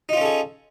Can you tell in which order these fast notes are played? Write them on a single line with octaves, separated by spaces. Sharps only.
D#4 F4 C#4 A4 G#4